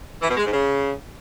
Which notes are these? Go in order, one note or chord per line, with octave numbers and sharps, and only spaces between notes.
E3
B2
G#3
G#2
C#3